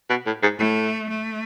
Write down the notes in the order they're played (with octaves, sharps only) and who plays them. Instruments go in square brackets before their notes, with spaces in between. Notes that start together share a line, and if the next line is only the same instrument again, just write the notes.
[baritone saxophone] B2
A2
G#2
[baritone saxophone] A2 [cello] A3
[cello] A3